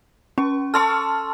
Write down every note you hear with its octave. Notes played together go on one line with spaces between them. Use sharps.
C#4 C#6
A4 A5 C6 C#6 F6